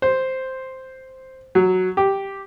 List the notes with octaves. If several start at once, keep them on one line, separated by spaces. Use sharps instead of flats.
C5
F#3
G4